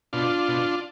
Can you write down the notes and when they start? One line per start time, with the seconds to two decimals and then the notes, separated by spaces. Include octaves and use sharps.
0.13 B2 D4 F4
0.48 B2